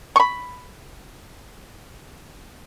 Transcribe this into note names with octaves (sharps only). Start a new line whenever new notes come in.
B5 C#6